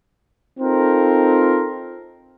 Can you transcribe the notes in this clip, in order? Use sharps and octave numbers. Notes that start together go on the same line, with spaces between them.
C4 D#4 F4 A4 A#4 C5